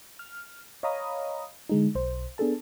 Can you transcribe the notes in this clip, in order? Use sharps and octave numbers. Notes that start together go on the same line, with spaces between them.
F6
C#5 D#5 F5 A#5 B5 D#6
D3 G#3 D#4
B1 C5
B3 D4 G#4 A4 A5